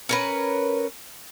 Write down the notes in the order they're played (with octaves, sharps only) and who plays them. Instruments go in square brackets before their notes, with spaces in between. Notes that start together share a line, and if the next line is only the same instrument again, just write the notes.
[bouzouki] C#4 A#4 B4